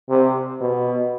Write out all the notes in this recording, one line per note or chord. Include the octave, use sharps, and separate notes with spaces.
C3
B2